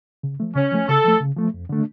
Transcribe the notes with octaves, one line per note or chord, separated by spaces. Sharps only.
C#3
F3 A3
C#3 C#4
F3 A3
C#3 A4
F3 A3
C#3
F3 A3
F2
D3 A3 D4